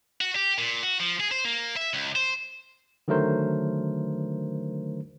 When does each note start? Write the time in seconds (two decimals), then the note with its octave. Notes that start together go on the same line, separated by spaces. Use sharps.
0.21 F#4
0.36 G4
0.58 A#2
0.83 F#4
1.00 F3
1.20 G#4
1.31 C5
1.45 A#3
1.76 E5
1.94 C#2
2.16 C5
3.08 D3 D#3 F#3 A3 A#4 C5